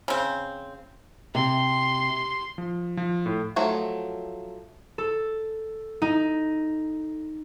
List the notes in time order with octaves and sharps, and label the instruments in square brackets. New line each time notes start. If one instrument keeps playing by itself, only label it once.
[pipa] C#3 C4
[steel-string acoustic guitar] C3 [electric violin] C6
[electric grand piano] F3
F3
A2
[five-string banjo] F3 F#3 A3
[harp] A4
D#4